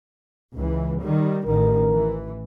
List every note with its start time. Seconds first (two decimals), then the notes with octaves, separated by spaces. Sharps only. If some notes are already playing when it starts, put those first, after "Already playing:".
0.54 C#2 E3
1.01 D#3 G3
1.46 A1 D#3 A#4
1.91 E3